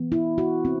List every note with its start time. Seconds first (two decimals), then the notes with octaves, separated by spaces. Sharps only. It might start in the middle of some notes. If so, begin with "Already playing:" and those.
Already playing: E3 B3
0.12 E4
0.38 F#4
0.65 C4